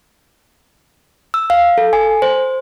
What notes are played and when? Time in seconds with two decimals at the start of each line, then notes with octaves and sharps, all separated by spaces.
1.34 E6
1.50 F5
1.78 A4
1.93 G#5
2.22 C5